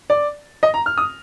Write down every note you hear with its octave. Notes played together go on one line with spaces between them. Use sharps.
D5
D#5
A#5
F6
D#6